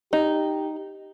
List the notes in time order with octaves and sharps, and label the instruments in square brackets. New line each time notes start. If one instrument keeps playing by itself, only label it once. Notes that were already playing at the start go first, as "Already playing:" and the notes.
[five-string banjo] D#4 [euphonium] G4